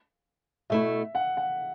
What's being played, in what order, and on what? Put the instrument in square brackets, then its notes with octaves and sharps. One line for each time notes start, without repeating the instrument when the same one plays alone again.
[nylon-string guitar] B2 A3 E4 [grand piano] E5
[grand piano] F#5
F#5